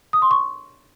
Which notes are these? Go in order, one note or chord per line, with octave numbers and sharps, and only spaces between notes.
D#6
C6
C#6